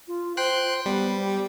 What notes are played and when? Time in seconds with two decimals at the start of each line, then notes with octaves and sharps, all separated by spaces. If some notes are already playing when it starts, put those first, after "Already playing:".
0.08 F4
0.37 C5 G5 C6 F#6
0.86 G3 B3
1.20 G4